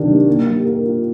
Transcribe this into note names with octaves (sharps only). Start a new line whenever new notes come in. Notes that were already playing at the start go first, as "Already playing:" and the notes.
Already playing: C3 D#3 D4
G3
A#3
G3
A#4
F4